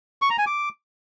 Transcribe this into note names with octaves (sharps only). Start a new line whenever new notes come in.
C#6
A#5
G#5
D6